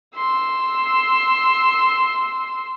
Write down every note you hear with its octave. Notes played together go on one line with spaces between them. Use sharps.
C6 E6